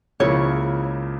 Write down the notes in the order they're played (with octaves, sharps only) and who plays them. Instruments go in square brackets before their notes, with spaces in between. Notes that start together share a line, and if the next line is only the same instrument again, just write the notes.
[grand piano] C#2 C#3 F3 A#3 E4 [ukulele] C#5